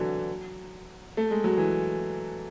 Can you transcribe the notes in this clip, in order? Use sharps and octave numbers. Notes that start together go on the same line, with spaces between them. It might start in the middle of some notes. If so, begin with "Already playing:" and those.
Already playing: D3 E3 F#3
A3
G#3
F#3
E3